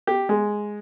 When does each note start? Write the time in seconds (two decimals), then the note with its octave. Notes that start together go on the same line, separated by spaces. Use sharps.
0.07 G4
0.29 G#3